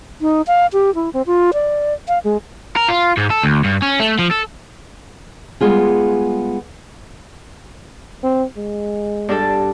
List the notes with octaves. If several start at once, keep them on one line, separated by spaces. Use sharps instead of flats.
D#4
F5
G4
E4
C4
F4
D5
F5
G#3
A#4
F4
G#2
A4
D2
G2
C#4
A3
F3
A4
G3 G#3 B3 F4 G#4
C4
G#3
G2 D4 A4